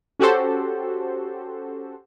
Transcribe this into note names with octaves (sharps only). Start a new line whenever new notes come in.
C#4 F#4 G4 A4 C5